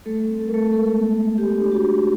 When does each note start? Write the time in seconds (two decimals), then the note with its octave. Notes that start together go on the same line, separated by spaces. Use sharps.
0.06 G3 A3 A4
0.28 C4
0.40 A4
0.47 A#4
0.51 G3 A3 A4
0.72 G#3 A3 A4
0.94 B3
1.16 G#3
1.38 A3 G4
1.60 D4
1.72 F#4
1.83 A3